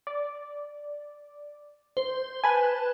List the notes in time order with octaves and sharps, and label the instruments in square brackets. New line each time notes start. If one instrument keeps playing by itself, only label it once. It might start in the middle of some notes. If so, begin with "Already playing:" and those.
[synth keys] D5
[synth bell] C5
[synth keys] B4 G#5 [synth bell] A5 F#6